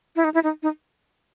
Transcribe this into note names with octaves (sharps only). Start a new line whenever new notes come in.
E4
D#4
E4
D#4
D#4